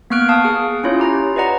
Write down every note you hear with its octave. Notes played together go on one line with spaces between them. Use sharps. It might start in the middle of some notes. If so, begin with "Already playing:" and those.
A#3 B3 C#6 F6 F#6 D7
F5 A5 D#6 F#6
G#4
C#4 E4 F4 C#5
G4 A#5
B4 D5 D#5 F#5 A#5